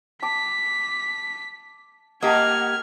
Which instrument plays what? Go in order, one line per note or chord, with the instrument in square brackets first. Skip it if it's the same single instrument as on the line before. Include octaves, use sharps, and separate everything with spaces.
[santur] A5 D6 [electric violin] B6
[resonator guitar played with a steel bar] A#3 G4 [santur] D#5 A5 [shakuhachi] F#5 [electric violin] F6 G#6